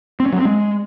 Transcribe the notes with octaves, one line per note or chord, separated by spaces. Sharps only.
C4
C#4
F#3
C4
G#3